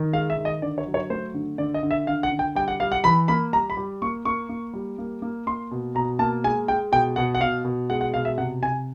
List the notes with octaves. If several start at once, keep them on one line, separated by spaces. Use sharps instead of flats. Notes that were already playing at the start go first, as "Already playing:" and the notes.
Already playing: D#3
G#3 F5
E5
D#3
D#5
D3 D5
C#5
F#3
C#5
A3 C5
D3
D3 D5
D#5
D3
E5
D3 F5
F#5
D3
G5
G3 G5
F#5
G3 F5
F#5
E3 B5
A#3 B5
G3 A#5
B5
G3
A#3 C#6
A#3 C#6
A#3
G3
A#3
A#3
A#3 C6
B2
B2 A#5
A#3 A5
G#3 G#5
G#3 G5
B2 G5
B2 F#5
F#5
B2 F5
B2
G#3 F#5
F#5
B2 F5
E5
C3 F#5
C3 G#5